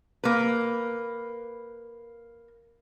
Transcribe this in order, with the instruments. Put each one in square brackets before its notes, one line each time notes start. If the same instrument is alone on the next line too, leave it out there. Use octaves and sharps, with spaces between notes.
[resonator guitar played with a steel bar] A#3 B4